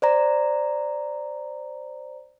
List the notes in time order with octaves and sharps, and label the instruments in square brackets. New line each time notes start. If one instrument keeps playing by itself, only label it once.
[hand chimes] C5 D5 A#5